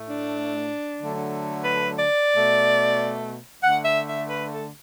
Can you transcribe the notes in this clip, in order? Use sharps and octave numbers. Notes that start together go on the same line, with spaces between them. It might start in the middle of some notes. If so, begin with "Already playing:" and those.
Already playing: A2 A3
D4
D3 F#3 A3
B4
D5
B2 A3
D3 A3 F#5
E5
E5
B4
A4